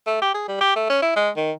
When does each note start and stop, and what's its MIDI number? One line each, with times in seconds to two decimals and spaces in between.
0.07 0.19 57
0.22 0.33 67
0.34 0.44 68
0.48 0.56 55
0.61 0.75 67
0.76 0.86 57
0.90 1.00 61
1.02 1.13 64
1.16 1.30 56
1.37 1.52 51